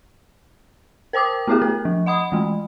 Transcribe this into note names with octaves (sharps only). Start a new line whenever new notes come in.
A#4 C5 G5 D6 D#6
A3 B3 E4 G4 G#4
A3 A#4
F3
D#5 F#5 B5 D#6
E3 G#3 A3